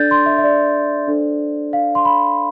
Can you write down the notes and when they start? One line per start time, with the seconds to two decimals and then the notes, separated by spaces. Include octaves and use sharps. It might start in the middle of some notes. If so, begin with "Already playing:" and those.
Already playing: D4 A4 D5 G6 A6
0.11 C6
0.26 E5
0.38 E5
0.43 D5
1.08 D4 A4 C5
1.73 F5
1.95 C6
2.05 B5